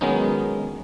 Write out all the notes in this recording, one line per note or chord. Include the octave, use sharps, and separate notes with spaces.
D#3 F#3 G#3 B3 C#4 D#4